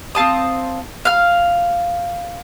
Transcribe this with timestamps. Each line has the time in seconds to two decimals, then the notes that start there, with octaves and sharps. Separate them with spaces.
0.15 C4 F5 A5 D#6
1.05 F5 F6